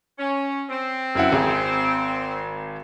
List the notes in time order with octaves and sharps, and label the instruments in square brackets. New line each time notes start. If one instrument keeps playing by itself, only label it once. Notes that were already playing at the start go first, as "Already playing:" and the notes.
[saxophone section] C#4
C4
[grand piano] F#2 E4 F#5
G#1 G#4